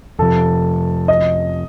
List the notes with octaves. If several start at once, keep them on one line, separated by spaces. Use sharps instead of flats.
F2 C3 F3 A4
D#5